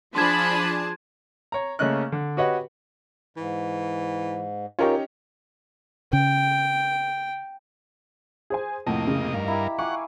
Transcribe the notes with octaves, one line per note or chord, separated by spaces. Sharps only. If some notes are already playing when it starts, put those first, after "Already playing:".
F3 D4 G#4 A5 B5 C6 G#6
C#5 A#5
C#3 A3 A#3 C#4 D#5 F#6
D3
F#4 G4 B4 C#5 D#5 F#5
G#2 E3
C#4 D#4 F4 G4 A#4 C#5
C#3 G5
G#4 C5 G#5
F2 A2 C3 A#3 D#5 F#5 A5
C#3
G2 D#3 A#4 F5
E4 G4 A#5
F5 F#5 G#5 C#6 D6